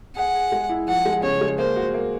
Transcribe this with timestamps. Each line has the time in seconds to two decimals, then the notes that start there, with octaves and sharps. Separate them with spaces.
0.16 G#4 F#5
0.35 G#4
0.52 G#3
0.69 E4
0.88 F3 F#5
1.05 G#3
1.23 C#3 C#5
1.41 G#3
1.58 A#3 C5
1.76 F#4
1.94 A#3